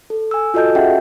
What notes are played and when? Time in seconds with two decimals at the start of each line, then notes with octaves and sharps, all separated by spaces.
0.10 A4
0.31 G#5 E6
0.54 F4 F#4 A4 D#5 A5 G6
0.75 C#4 F#4 G#4 E5 F#5 G5